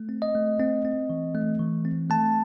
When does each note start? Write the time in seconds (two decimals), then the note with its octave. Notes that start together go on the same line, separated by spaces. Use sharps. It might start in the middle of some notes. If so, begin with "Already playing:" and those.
Already playing: A3
0.09 C4
0.22 D#5
0.35 A3
0.60 C4
0.85 C4
1.10 E3
1.35 A3
1.60 E3
1.85 C4
2.10 A3 A5